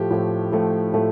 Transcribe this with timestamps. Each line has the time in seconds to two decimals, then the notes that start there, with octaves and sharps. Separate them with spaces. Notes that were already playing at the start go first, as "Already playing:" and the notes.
Already playing: A2 F3 A3 G4
0.11 A2 F3 A3
0.52 A2 F3 A3
0.94 A2 F3 A3